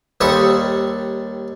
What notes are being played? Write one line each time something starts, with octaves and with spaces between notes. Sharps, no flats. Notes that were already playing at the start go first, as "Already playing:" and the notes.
D#2 G3 A4 C5 C#6 D#6